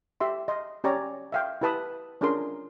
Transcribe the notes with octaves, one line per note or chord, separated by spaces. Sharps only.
G4 E5 C6
D#5 C6
C#4 G4 C#5 D5 A#5
E5 F5 G5
E4 G4 B4 A5 B5 D#6
C#4 D4 F4 G#4 A#4 C6